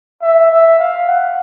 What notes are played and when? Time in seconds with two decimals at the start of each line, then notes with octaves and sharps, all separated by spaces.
0.22 E5
0.51 E5
0.79 F5
1.08 F#5